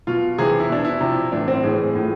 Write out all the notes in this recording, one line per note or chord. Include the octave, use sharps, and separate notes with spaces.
B2 F4
C3 E3 G#4
E4
B2 D4
E4
C3 F3
A2 E3 D4
C4
A2 E3 G#4
A2 F3